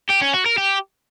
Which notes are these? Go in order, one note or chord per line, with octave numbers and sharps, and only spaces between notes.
G4
C#4
F#4
A#4
G4